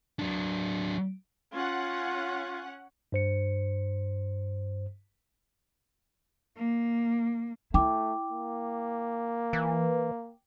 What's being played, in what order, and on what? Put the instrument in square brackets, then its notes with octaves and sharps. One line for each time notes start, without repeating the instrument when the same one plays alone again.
[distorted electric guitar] F#3 D4
[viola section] C#4 F#5 [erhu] F4
[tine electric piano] G2 C5 C#7
[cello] A#3
[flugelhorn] A3 [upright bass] E4 [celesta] G5 D6
[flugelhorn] A#3
[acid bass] E3